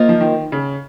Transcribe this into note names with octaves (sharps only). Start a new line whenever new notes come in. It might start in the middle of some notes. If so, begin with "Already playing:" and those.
Already playing: A#3 F4 C5 D#5
F3
D#3
C#3